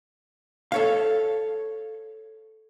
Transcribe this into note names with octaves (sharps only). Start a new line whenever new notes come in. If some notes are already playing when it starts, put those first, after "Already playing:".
A4 C#5 F5